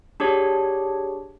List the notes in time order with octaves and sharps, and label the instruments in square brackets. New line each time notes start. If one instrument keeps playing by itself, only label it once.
[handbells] D4 G4 G#4 C#5